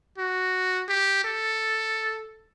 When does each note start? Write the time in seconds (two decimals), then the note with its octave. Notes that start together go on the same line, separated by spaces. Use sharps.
0.18 F#4
0.89 G4
1.24 A4